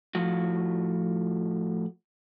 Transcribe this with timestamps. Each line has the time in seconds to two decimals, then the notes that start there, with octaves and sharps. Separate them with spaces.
0.15 A2 F3 F4 F#4